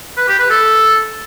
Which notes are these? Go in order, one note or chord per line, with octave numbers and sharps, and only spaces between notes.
B4
G4
B4
A4